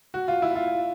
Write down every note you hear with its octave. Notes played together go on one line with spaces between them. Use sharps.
F#4
F4
E4
F4